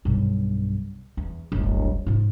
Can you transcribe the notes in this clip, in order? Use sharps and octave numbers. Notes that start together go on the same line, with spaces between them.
B1 G2
E2
D1 G1
G#2 F4